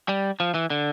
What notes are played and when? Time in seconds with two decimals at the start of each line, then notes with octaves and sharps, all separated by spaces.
0.09 G3
0.40 F3
0.54 E3
0.70 D3